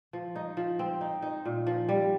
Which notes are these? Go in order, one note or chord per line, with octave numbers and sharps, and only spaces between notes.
F3
D#4
F3
C4
D#4
D#4
A#2
F3
G3